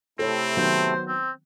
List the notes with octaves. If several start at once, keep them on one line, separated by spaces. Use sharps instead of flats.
C3 A3 C4 E4 A4 C#5
D#3 F#3 B3 C5
C4